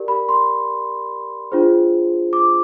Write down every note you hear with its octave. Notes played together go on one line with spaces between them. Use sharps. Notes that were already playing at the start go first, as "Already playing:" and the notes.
Already playing: G4 A#4 D5
B5
C6
D4 F4 G#4 C5
D6